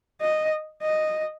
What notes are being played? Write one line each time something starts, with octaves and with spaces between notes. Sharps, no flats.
D#5
D#5